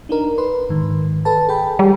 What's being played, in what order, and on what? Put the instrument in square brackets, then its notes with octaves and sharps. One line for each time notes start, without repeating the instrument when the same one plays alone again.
[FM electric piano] D4 D#4 A#4
B4 C6
G#2 D#3
A4 B4 A5
G#4 G5 B5
[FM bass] G3